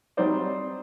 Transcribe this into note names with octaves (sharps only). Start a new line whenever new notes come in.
F#3 G3 C4 D#4 C5 D5